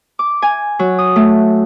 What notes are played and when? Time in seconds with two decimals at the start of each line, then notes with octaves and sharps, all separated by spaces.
0.19 D6
0.42 G#5
0.79 F#3
0.98 D#6
1.16 A3